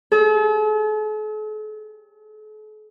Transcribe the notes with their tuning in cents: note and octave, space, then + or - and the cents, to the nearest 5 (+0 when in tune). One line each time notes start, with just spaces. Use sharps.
A4 -45